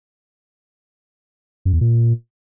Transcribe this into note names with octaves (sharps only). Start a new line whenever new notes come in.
F#2
E2
A#2